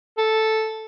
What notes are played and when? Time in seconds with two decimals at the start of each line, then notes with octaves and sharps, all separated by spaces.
0.18 A4